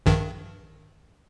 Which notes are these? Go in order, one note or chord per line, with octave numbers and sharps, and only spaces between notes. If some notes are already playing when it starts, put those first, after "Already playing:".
A#1 G2 D#3